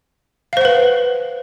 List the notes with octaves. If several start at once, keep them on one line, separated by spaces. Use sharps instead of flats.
B4 C5 F5 F#5